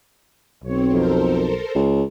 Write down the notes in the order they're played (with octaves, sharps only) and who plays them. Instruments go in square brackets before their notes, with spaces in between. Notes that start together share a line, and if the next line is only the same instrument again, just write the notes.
[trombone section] B1 [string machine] C4 C#5
[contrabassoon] F2 [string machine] A4 A#4 C5
[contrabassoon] C#2